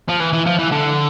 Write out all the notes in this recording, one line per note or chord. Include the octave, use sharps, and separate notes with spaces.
F3
E3
E3
F3
E3
D3